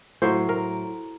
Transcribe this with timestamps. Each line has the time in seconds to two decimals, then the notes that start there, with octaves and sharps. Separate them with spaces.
0.22 A2 F#3 C5
0.49 A#4